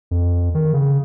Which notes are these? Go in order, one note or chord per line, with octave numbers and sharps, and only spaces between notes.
F2
D#3
C#3